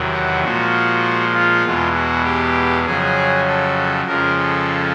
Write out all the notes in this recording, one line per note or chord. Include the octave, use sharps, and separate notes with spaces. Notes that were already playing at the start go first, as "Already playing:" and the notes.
Already playing: E2 C3 D#3 F#3
F#4
A#2 F3 G#3 F#4
F4
E2 B2 G#3
F#4
G4
F2 C#3 F#3 G#4
A4
F2 C#3 F3 G#3 A#4
A4